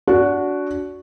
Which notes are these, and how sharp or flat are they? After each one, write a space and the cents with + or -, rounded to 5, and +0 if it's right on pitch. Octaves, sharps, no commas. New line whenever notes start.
D4 -25 F#4 +0